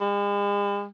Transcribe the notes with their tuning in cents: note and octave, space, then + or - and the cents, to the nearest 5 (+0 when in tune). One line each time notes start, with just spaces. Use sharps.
G#3 -45